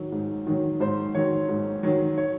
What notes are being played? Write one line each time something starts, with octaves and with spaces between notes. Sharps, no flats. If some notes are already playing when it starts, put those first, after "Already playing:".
Already playing: D#3 F#3
G#2
D#3 F#3
G#2 C5
D#3 F#3 C#5
G#2
D#3 F#3
C#5